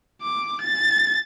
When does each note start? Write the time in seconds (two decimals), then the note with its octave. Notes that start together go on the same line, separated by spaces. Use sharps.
0.22 D6
0.62 A6